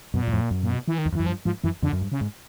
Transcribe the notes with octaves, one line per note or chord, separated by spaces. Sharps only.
F#2 B2
A#2
F#2
F2 A2
A#2
F#2
A#2
B2
E3
D#3
E2
F2
F#2 E3
G2 F3
G#2 F3
F#2 E3
F2 D3
F#2
G2
C#3
G#2